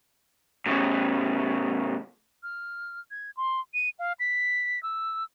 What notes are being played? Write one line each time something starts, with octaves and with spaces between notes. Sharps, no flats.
A2 C#3
F6
G#6
C6
D#7
F5
B6
E6